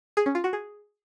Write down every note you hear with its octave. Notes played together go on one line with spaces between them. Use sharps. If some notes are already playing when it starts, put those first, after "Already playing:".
G#4
C#4
F4
F#4
G#4